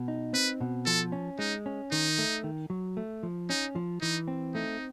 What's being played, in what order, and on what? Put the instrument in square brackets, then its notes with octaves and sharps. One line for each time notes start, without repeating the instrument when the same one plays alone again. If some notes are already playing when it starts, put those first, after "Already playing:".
Already playing: [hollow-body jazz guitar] B2
D#4
[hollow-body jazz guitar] C4 [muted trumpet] B4
[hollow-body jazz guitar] B2
[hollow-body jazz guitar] F3 [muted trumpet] A4
[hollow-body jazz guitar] C#4
[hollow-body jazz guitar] G#3 [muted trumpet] D#4
[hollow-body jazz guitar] C#4
[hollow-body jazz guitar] D#3 [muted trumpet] D#4
[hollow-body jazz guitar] A3
D#3
F#3
A3
F3
[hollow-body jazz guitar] C#4 [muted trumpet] D#4
[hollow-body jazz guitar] F3
[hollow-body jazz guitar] E3 [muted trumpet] D#4
[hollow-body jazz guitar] C4
[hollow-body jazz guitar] A3 [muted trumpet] D#4